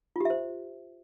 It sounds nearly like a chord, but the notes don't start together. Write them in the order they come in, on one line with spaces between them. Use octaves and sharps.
F4 G4 E5 C5